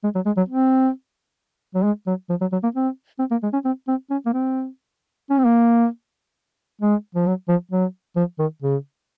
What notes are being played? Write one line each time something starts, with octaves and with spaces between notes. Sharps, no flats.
G#3
F#3
G#3
F#3
C4
F#3
G#3
F#3
F3
F#3
F#3
A#3
C4
C4
A#3
G#3
C#4
C4
C4
C#4
A#3
C4
C#4
C4
A#3
G#3
F3
F#3
F3
F#3
F3
D#3
C#3